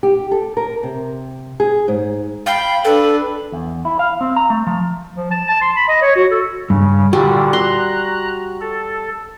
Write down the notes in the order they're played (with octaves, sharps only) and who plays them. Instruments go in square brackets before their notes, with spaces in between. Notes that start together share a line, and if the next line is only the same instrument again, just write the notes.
[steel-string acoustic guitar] G4
A4
A#4
C3
G#4
G#2
[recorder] F5 [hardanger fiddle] G5 B5
[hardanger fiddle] D4 B4 [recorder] A4
[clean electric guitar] E2
E4
F5
C4
A#5
A3
F3
[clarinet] F3
A5
A5
C6
B5
D#5
C#5
F#4
A4
[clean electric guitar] G2 [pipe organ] C#3
[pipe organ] A#2 D3 [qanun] G3 [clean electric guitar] F#4
[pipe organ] A#5 F#6 [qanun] C6
[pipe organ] A4